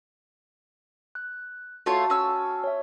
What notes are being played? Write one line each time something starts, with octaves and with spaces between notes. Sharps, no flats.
F#6
A3 F4 F#4 C#5 A5
C#4 E6
C#5 E5